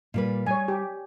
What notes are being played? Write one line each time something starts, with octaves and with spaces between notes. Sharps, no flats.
A#2 G3 B4
G3 C#5 G#5
G4